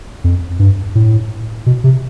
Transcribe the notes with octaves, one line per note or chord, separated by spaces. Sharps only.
F2
G2
A2
B2
C3